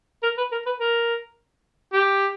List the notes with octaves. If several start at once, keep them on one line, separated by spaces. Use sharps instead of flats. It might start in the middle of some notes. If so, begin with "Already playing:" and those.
A#4
B4
A#4
B4
A#4
G4